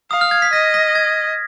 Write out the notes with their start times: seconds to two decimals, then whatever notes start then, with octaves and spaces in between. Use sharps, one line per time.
0.11 F5 D#6
0.21 F6
0.31 G#6
0.42 B6
0.53 D#5 A#6
0.74 A#6
0.95 G#6